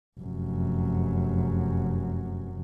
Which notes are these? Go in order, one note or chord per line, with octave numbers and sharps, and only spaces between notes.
F1 F#2